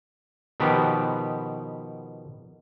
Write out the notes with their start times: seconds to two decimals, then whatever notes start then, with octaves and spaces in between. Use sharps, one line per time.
0.60 B2 D#3 F3 B3 G4